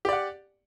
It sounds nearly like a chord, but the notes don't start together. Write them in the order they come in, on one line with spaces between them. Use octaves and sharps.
G4 D5 F#5